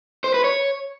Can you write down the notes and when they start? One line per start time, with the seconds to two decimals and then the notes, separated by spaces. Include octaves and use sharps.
0.24 C5
0.34 B4
0.44 C#5